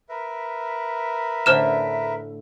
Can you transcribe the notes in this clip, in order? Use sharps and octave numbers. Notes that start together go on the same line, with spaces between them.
A#4 B4 E5
A2 D3 A3 C5 F6 E7